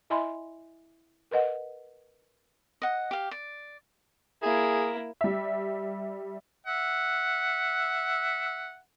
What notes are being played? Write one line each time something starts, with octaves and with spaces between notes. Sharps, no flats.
E4 D#5 E5 G#5 B5 C6
A#4 B4 D#5 F#5
D#5 F#5
G4 F5
D5
A#3 E4 G#4
G3 E5
E5 F#5